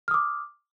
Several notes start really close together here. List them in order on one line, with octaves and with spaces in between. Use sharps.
F6 D#6 D6